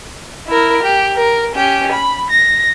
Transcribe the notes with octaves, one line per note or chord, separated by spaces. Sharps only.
E4 A#4
G4
A#4
C#4 G4
B5
A#6